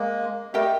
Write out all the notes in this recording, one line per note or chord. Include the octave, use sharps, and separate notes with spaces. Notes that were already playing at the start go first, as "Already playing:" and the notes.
Already playing: G#3 A#3
G3 A3 G4 A#4 D#5 G5